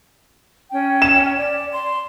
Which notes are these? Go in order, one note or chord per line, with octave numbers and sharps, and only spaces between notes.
C#4 G5
E7
D5
C6